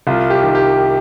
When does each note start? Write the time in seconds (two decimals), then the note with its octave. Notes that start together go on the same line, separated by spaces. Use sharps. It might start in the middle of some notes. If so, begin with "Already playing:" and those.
0.07 C2 F4
0.30 G4
0.43 D#3
0.55 G4